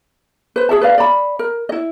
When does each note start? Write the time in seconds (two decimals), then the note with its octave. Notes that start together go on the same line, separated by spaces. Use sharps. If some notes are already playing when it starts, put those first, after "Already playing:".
0.56 B4 C5
0.69 G#4 A4 E5 A5
0.81 B4 D5 F5
0.98 D5 B5
1.39 A#4
1.69 E4 D#5